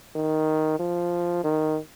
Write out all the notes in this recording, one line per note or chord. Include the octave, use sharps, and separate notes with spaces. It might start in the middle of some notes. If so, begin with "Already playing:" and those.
D#3
F3
D#3